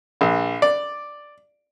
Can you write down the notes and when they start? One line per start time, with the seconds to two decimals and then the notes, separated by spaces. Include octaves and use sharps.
0.21 A#1
0.62 D5